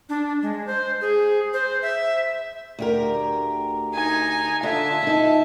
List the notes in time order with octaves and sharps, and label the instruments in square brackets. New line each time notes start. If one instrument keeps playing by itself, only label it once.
[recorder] D4
G#3
C5
G#4
C5
E5
[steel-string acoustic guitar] D2 G4 A#4
[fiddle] D#4 G#5
[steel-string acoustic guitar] D3 F4 [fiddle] E5 A5
[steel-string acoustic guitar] D#4 E4